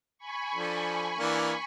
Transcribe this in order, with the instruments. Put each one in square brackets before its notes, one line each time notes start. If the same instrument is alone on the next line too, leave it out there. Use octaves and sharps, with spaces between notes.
[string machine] G#5 B5 C#6
[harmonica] F3 D4 A4
E3 A#3 D4